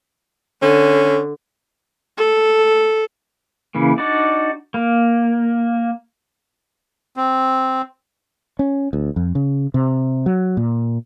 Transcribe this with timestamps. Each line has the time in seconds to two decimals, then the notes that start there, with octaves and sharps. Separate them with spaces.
0.62 D3 C#4
2.18 A4
3.75 C#3 E3 A#3
3.98 D4 D#4 F#4 D5
4.74 A#3
7.17 C4
8.59 C#4
8.93 D2
9.16 F2
9.35 C#3
9.74 C3
10.26 F#3
10.57 A#2